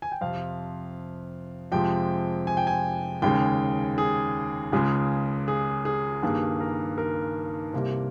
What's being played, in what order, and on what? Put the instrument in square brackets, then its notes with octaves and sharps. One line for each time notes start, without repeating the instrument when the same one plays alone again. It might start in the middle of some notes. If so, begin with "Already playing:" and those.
[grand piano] G#5
G5
F2 C3 F3 F5
F2 C3 F3 G#3 G5
G#5
G5
G#5
D#2 C#3 G#3 G5
G#4
C#2 C#3 G#3 G#4
G#4
G#4
G2 D#3 G3 A#3 G#4
A#4
A#4
C2 C3 G3 A#3